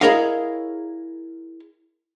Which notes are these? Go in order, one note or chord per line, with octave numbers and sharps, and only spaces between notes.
E4 G#4 A#4 C#5 D#5 F5